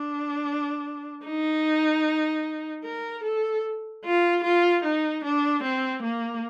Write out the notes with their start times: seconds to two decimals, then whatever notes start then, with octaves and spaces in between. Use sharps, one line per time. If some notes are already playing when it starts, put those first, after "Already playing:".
Already playing: D4
1.25 D#4
2.84 A#4
3.23 A4
4.04 F4
4.44 F4
4.84 D#4
5.24 D4
5.63 C4
6.03 A#3